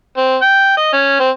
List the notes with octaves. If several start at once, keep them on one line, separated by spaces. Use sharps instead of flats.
C4
G5
D#5
C#4
C4